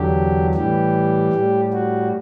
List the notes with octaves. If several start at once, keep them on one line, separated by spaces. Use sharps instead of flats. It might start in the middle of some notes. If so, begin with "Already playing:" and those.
Already playing: E2 D3 F#3 G4
A2 E3 G3 G4
A2 G3
F#4